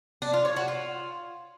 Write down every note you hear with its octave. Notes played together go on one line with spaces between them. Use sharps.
D4
F4
C#5
F#4
F4